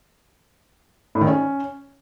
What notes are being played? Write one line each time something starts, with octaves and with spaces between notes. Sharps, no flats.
A2
D#3
C#4